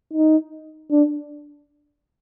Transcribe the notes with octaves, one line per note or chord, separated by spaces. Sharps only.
D#4
D4